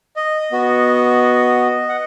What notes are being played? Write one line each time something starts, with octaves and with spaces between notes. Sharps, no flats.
D#5
B3 F#4
F#5